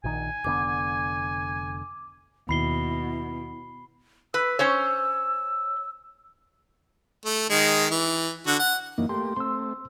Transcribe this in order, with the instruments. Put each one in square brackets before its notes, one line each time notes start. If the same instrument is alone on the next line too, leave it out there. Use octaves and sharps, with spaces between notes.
[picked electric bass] A#1 D#3 [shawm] G#5
[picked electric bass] F1 D3 B3 [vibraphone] D6
[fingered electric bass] D#2 [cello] B2 [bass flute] E4 [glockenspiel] B5 C7 G7
[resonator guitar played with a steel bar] B4 [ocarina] E6
[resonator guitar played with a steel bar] C#4 C5 C#5
[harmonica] A3
D#3 G#3
E3
D3 F#4
F#5
[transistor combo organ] F#2 E3 D#4 [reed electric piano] A#3
[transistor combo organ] A3 A#3 G4 [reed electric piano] C6
[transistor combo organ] A3 C4 [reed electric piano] C6 E6